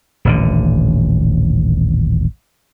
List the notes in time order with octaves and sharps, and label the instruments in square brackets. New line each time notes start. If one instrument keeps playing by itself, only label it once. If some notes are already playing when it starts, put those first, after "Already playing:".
[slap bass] D#1 A1 D3